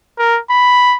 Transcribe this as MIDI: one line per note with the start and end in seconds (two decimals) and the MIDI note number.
0.18 0.39 70
0.50 0.97 83